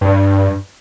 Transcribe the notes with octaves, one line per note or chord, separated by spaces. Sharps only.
G2